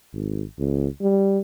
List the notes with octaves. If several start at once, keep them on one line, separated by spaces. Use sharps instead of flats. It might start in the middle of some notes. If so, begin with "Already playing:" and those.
G#1
C#2
G3